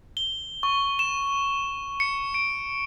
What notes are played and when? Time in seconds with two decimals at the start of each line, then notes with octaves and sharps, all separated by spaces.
0.17 G7
0.63 C#6
0.99 E7
2.00 C#7
2.34 D7